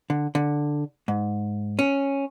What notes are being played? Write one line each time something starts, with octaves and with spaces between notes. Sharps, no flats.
D3
D3
G#2
C#4